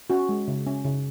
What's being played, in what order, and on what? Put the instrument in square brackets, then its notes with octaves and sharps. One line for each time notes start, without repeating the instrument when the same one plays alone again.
[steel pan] C#4 F#4
G#3
C#3
C#4
C#3